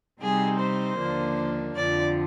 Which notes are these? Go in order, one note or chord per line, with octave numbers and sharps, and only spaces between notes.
C3 G3 C4 D#4 G#4
C5
D#2 D3 F3 A#3 D4
F2 D3 F3 D5